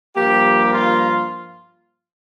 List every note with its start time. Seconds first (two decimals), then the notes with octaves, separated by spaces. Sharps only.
0.16 G2 F3 A#3 G4
0.72 F4